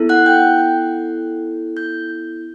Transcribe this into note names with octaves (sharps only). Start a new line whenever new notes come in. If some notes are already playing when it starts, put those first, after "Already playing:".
Already playing: B3 E4 A4
F#5 F#6
G5 G6
G6